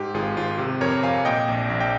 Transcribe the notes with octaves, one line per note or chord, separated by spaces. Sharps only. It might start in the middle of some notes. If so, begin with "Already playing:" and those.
Already playing: G#2 G4
G#1 F4 G#4
G#1 F4
C3 G4
F2 A#4 C#5
F2 F5 G#5
A#2 D#5 G5
A#1
A#1
G5